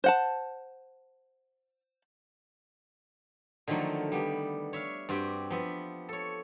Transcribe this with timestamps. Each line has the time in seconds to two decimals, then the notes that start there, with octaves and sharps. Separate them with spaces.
0.04 C5 F#5 A5
3.68 D3 D#3 F3 F#3 A3 A#3
4.12 G3 B3 G4
4.73 C#5 E5 F5
5.09 G2 C4 F#4 G4
5.50 F3 B3 E5
6.09 A4 C#5